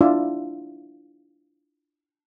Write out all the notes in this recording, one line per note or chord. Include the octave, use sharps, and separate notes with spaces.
D4 E4 F4 D5 E5